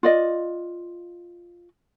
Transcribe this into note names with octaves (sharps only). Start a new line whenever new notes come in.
F4 D5 D#5